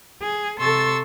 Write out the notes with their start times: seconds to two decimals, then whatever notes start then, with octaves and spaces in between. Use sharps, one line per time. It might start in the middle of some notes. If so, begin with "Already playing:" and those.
0.22 G#4
0.57 C3 A4 C6 C#6 E6 A6